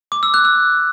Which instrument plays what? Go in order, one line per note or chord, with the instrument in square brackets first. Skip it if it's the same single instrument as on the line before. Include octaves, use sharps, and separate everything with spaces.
[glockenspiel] D6
E6
F#6
E6